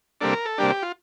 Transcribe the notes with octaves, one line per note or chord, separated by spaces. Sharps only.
C3 G3 A#3 D4 A4
A#4
A4
C3 G3 A#3 D4 G4
G4
F4